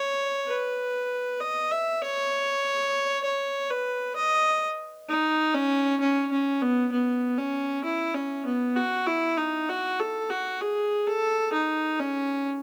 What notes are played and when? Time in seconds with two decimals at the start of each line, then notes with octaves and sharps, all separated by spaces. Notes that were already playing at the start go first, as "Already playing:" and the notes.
Already playing: C#5
0.47 B4
1.40 D#5
1.71 E5
2.02 C#5
3.24 C#5
3.71 B4
4.16 D#5
5.09 D#4
5.54 C#4
6.01 C#4
6.32 C#4
6.62 B3
6.92 B3
7.38 C#4
7.84 E4
8.15 C#4
8.46 B3
8.76 F#4
9.07 E4
9.38 D#4
9.69 F#4
10.00 A4
10.30 F#4
10.61 G#4
11.07 A4
11.53 D#4
11.99 C#4